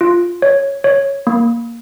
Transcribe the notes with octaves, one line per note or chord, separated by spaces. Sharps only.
F4
C#5
C#5
A#3